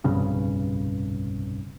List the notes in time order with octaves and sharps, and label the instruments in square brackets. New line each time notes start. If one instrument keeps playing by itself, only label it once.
[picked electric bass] F1 B1 G2 C#3